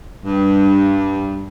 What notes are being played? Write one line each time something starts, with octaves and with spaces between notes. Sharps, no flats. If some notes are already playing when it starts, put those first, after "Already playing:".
G2